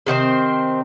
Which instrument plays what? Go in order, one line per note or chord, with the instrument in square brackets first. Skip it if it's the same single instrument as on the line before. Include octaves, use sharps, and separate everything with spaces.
[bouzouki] C3 D#3 C4 C5